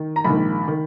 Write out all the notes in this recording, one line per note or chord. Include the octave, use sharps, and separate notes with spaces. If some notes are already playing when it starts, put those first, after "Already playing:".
Already playing: D#3
A#5
A#1 G#2 D#3 B5
D#3